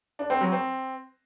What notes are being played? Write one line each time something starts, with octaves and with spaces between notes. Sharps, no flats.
D4
C4
F#3
C4